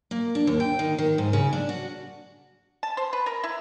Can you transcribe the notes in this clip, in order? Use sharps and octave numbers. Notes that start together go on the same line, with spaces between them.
A#3
D4
D#2
G5
D#3
D#3
G#2
C#3
D4
F#4
A5
C5
B4
A#4
E4